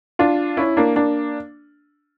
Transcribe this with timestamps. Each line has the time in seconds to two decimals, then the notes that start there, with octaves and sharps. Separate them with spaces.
0.19 D4 F4
0.57 C#4 E4
0.77 A#3 D4
0.96 A#3 D4